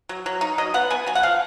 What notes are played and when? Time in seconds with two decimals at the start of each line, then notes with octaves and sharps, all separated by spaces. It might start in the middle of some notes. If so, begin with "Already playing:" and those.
0.09 F#3
0.26 F#3
0.41 D#4
0.58 F#3 D#5
0.74 B3 F#5
0.90 B3 G#5
1.07 F#3 G#5
1.15 F#5
1.23 F3 F5